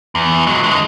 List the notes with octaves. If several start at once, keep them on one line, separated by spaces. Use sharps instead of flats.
E2
F#3 G#3
D3 G#3